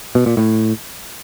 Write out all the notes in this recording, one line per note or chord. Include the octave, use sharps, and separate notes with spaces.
B2
A#2
A2